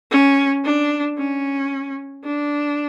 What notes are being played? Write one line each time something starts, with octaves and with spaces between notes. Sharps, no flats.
C#4
D4
C#4
D4